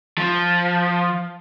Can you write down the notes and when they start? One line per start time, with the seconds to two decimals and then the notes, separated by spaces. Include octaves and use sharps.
0.18 F3